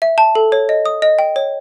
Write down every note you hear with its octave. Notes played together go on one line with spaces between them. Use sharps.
E5
A5
A4
C#5
D#5
D#6
D#5
G5
C#5